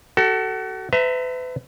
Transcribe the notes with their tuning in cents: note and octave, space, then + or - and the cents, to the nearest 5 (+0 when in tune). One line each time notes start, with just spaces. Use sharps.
F#4 +35 A4 +10
B4 +40 E5 +0 A#5 -30